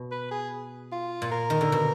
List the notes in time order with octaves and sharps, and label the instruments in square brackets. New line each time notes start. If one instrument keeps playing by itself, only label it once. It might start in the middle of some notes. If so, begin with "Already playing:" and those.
Already playing: [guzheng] B2
[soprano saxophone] B4
G#4
F4
[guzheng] A#2
[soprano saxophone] A#4
[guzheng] D#3
D3
B2